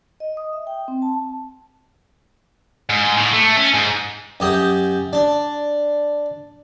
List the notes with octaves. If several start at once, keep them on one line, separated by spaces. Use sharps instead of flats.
D#5
D#6
E5
G5
C4
A5
G#2
A2
A3
C#4
G#2
F#2 G4 D#6
D4